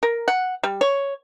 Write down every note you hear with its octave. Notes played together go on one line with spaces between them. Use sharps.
A#4
F#5
G3
C#5